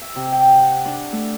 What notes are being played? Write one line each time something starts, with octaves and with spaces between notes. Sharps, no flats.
E5
C3
G5
F#5
D4
A3